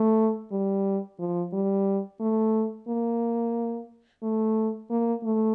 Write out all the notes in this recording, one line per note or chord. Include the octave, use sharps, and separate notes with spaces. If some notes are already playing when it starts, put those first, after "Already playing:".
Already playing: A3
G3
F3
G3
A3
A#3
A3
A#3
A3